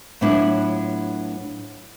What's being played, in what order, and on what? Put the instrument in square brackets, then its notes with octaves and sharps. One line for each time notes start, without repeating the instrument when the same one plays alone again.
[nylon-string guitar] A2 F#3 B3 D4 E4 F4